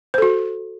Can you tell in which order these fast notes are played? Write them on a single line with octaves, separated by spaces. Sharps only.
C5 A4 F#4